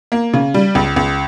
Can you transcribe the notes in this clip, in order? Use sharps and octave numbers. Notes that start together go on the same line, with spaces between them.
A#3
C#3
G3
C#2
C#2